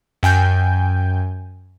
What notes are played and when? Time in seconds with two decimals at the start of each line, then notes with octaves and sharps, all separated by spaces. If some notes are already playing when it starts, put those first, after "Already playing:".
0.23 F#2 G5 G#5 G6